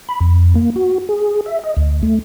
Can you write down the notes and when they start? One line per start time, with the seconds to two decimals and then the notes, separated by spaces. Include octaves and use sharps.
0.09 B5
0.20 F2
0.55 A#3
0.76 F#4
1.09 G#4
1.46 E5
1.64 D#5
1.77 D2
2.03 A3